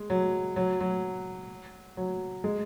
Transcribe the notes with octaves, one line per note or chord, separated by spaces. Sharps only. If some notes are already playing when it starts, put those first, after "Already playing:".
Already playing: G#3
F#3
F#3
F#3
F#3
G#3